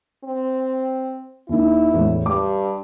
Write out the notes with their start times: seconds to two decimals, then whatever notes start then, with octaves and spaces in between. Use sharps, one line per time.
0.24 C4
1.49 D#2 D#3 E4
1.94 E2 A2
2.26 G2 D6